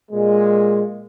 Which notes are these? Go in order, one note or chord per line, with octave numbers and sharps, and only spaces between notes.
A#2 G#3